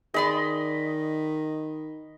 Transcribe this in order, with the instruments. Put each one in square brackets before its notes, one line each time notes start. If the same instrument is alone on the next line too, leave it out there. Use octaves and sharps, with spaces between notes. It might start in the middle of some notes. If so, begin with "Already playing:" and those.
[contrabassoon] D#3 [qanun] G#4 D5 C6 [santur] D#5 B5